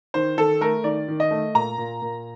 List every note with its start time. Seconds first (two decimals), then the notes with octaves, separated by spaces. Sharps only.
0.14 D#3 C5
0.38 D#3 A4
0.61 A3 A#4
0.84 D#3 D5
1.08 D#3
1.20 D#5
1.31 A3
1.54 A#2 A#5
1.78 A#2
2.02 A#2